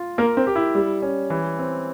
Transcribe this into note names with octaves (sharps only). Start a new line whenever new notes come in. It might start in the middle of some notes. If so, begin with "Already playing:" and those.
Already playing: F4
A#3 A#4
C4
G4
E4
G3
C#4
E3
C4